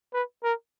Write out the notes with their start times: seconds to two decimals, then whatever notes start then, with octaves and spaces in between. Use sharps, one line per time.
0.13 B4
0.44 A#4